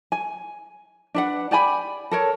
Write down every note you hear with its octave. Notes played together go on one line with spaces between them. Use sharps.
G#5
D4 B4 F#5
G4 D5 G#5 B5
A4 A#4 C#5